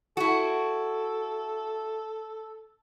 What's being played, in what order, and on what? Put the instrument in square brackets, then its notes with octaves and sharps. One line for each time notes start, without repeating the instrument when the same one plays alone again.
[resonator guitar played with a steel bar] E4 F#4 [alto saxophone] A4